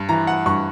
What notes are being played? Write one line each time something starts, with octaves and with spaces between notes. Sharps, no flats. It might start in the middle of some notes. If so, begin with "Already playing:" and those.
Already playing: G2
E3 A#5
F#5
G2 C#6